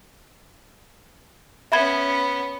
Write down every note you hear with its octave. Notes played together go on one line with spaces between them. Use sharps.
B3 C#4 E5 B5 G#6